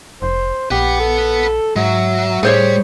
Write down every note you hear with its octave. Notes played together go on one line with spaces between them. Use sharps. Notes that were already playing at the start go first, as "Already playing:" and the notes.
F1 C5
A#1 G4 B4 F#5
A4
G#2 F#3 E5
A2 G3 G#4 C5 C#5